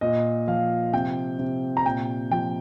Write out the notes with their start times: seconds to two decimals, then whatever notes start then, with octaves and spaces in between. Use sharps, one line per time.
0.01 A#2 D#5
0.47 F3 F5
0.93 C3 G5
1.39 C3
1.77 A#5
1.85 A#2 G5
2.31 F3 G5